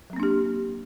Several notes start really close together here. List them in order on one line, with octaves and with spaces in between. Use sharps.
F#3 C4 A#3 D4 G4